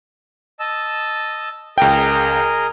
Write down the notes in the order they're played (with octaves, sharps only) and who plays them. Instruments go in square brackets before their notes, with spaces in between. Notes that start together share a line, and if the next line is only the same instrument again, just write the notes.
[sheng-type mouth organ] D#5 A5 E6
[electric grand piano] C#2 G5 [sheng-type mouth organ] G#4 A#4 D#5